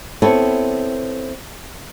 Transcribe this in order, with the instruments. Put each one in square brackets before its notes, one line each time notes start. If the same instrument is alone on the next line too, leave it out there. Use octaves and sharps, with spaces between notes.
[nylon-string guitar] B3 C4 E4 A4 C#5